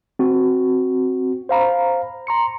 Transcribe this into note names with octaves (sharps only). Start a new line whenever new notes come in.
C4 F#4
C5 F5 A#5 B5
A#5 C6 C#7